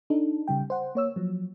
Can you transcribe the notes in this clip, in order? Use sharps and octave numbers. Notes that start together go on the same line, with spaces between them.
D4 D#4 A4
C#3 G3 G5
C5 F#5
A#3 C#5 E6
F3 F#3